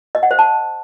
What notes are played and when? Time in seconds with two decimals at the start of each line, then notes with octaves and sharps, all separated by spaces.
0.15 D#5
0.23 F#5
0.31 C5
0.39 A5